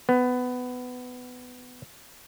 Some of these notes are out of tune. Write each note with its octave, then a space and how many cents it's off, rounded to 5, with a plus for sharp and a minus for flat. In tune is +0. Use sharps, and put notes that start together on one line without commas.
B3 +15